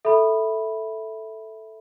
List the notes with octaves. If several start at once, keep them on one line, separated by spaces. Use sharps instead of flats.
A4 E5 B5